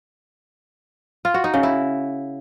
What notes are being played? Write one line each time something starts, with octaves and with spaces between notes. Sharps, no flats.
F4
F#4
D#4
C#3
E4